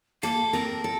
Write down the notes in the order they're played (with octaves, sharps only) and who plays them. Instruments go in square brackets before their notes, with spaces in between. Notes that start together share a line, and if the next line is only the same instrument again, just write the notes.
[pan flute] A#3 [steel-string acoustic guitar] A4
[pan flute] C4 [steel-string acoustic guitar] A#4
[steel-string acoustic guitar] A4